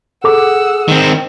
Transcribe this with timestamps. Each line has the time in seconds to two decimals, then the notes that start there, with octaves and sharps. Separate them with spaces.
0.24 G#4 A4 F#5 D6 E6
0.88 D#3 C4